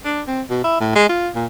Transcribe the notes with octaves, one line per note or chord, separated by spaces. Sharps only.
D4
C4
B2
E4
A2
G#3
F4
A#2